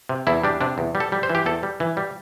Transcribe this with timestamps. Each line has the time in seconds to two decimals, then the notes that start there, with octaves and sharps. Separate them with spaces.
0.09 C3
0.27 E2 E4
0.44 G3 D4
0.61 C3 D4
0.78 E2
0.95 G3
1.00 A4
1.12 G3
1.23 C5
1.30 E3
1.35 G4
1.46 E2 A4
1.63 G3
1.80 E3
1.97 G3